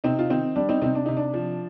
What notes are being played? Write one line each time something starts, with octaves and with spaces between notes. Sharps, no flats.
C3 C4 D#4
F4
D#3 C4 D#4
G3 D4
C4 D#4
C3 C4 D#4
D4
C3 D#4
D4
F3